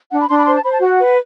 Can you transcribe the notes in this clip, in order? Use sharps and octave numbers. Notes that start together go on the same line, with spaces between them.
D4 F#5
B5
D4 C6
B5
C5 C6
A5
C5 B5
A5
F#4 F#5
B4